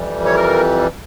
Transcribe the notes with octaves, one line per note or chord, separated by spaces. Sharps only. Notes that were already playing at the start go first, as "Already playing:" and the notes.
Already playing: F2 E3 G3
C#5
A#4